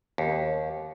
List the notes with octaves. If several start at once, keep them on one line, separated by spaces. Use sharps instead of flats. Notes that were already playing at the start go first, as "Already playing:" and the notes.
D#2